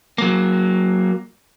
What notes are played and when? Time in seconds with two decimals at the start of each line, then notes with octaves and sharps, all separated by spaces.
0.18 F#3 A#3